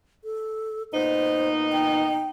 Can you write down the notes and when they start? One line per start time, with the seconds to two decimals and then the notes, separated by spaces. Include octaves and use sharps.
0.24 A4
0.93 A#2 B3 D#4 C5
1.72 G5